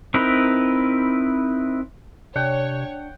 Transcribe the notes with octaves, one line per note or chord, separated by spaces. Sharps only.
C4 D#4 E4 A#4 B4
C3 D4 C#5 F#5 G5